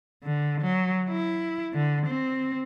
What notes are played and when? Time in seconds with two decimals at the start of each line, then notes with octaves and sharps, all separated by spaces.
0.24 D3
0.62 F#3
1.10 E4
1.74 D3
2.07 C4